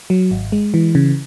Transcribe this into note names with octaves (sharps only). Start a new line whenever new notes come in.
F#3
G#1
G#3
E3
C#3